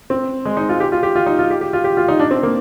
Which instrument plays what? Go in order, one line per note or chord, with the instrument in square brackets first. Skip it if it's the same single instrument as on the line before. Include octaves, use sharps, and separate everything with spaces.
[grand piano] C4
G#3
D#4
F4
G4
F4
G4
F4
D#4
F4
G4
G4
F4
G4
F4
D#4
D4
C4
A#3